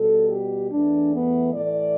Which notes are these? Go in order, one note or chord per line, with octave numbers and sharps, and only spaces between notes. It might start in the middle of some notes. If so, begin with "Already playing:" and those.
Already playing: B2 G3 A4
G4
E2 E3 A3 D4
B3
A2 E3 A3 D5